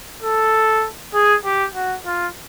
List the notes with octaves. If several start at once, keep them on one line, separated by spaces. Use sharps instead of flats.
A4
G#4
G4
F#4
F4